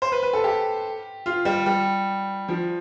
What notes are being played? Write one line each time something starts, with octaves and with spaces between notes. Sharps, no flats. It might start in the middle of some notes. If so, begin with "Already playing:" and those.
C5
B4
B4
A4
G4
F4
G3
G3
F3